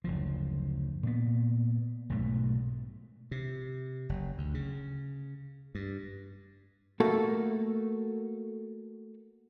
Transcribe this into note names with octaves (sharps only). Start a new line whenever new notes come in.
F#1 D2 F3
A#2 B3
B1 G#2 B2 A3
C3
F#1
D2
C#3
G2
A3 A#3 F#4 A4